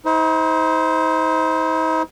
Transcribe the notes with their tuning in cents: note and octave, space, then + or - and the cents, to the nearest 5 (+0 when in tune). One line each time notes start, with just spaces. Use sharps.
D#4 +45 C5 -15